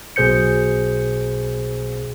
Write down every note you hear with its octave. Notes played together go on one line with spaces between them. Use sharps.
B1 B2 G#4 C5 G6 C#7